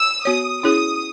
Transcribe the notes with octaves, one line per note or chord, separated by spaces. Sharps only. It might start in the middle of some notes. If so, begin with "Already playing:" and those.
Already playing: E6
B3 F#4 C#5 D#6
C#4 E4 G#4 C#5 D#6